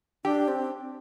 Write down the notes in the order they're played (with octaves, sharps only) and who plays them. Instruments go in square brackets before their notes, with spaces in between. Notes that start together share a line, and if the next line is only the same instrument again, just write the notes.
[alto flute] D4 [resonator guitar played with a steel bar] G4
[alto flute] C4